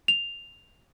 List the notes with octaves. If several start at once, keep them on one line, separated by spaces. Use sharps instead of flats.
F7